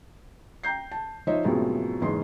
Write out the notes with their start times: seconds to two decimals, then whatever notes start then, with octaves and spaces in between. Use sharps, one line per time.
0.63 G5 A#5 G6 C7
0.91 A5
1.27 F3 D#4 C5 C#5 D#5 E5
1.45 F#2 A2 C3 F3 G#3 B3
2.02 F#1 E2 G#2 C6